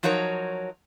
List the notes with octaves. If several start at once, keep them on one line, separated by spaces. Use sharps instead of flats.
F3 F#3 D#4 A#4 C#5